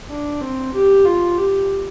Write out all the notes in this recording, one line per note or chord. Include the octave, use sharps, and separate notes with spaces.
D4
C4
G4
F4
G4